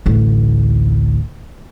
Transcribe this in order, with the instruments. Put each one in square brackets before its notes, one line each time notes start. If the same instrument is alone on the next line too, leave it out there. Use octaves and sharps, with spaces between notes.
[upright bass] A1 D2